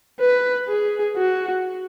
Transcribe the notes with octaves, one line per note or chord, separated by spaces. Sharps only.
B4
G#4
F#4